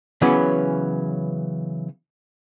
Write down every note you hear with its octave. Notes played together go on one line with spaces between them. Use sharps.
C#3 E3 F#3 B3 C#4